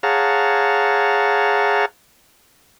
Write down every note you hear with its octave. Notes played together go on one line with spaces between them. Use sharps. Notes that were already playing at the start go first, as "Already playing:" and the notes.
G#4 C#5 F5 F#5 A5 A#5